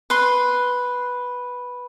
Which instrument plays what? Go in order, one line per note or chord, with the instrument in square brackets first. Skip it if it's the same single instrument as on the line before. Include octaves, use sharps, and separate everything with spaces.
[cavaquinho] B4 C6